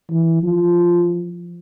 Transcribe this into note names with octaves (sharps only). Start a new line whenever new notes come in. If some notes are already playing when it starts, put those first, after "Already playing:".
E3
F3